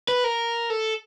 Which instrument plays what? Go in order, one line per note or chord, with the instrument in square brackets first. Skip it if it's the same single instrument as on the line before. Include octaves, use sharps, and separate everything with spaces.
[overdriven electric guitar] B4
A#4
A4